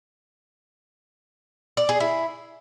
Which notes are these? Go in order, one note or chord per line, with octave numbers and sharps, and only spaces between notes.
D5
G#4
E4